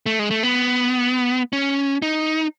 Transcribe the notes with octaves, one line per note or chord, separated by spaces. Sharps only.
A3
G#3
A3
B3
C#4
D#4